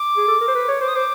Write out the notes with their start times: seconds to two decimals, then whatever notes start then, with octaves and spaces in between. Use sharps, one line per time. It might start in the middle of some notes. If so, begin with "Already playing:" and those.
Already playing: D6
0.17 G#4
0.28 A4
0.41 A#4
0.48 C5
0.55 B4
0.68 C#5
0.81 C5 D6
0.88 D#6
0.95 C5 D6